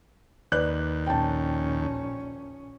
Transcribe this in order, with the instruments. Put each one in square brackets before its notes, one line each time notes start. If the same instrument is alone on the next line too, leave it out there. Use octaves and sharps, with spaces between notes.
[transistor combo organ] D#2 [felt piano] B4 D5 F#6
[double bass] A#1 C#4 [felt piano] G5 A5